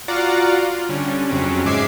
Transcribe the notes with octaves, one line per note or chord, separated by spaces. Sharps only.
F4 F#4 D5 F5 F#5 A#5
F4
D3 G3 C#4
F2 C#3 F#3 C4 C#4
G#2 G#3 E5 D6 G#6 C7